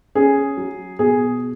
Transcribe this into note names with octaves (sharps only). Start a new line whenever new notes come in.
C#4 G#4
F#3
B2 G#4